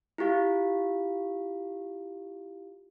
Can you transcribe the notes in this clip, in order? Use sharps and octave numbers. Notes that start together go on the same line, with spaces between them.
E4 F4 G4 F5